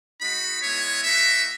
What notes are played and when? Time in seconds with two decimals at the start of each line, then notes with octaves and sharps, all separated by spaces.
0.21 G#3 D#4 F#4 B5
0.63 G#3 B3 E4 C#5
1.03 A#3 D#4 F#4 E5